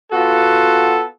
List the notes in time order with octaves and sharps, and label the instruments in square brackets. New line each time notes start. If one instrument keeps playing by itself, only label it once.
[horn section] B3 F4 F#4 A4